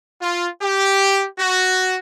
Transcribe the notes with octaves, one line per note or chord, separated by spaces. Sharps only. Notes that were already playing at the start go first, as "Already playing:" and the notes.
F4
G4
F#4